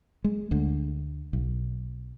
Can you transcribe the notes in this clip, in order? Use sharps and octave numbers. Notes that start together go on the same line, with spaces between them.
G#3
D2 D3
B1